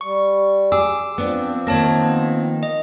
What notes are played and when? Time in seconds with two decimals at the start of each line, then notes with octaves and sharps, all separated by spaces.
0.01 G3 C#6
0.72 G#4 D6 E6
1.18 F3 B3 C4 D4
1.67 D#3 A#3 C#5 A5 A#6
2.02 B3
2.63 D#5